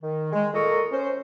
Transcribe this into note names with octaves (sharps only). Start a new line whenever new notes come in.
D#3
G#3
A#2 A4 A#4 D#5 C#6
C#4 C5